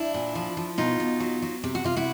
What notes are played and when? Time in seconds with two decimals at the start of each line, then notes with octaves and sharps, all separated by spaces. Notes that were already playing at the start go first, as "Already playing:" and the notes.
Already playing: D4 E4
0.14 A#2
0.35 F3
0.57 F3
0.78 B2 D#4 F4
1.00 B2
1.20 F#3
1.42 F#3
1.64 C3 G4
1.75 F#4
1.84 C3 F4
1.97 E4 F#4